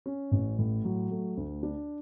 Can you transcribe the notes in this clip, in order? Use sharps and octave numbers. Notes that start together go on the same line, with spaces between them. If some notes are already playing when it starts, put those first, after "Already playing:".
C#4
A1
A2
F#3
A3
D2
D4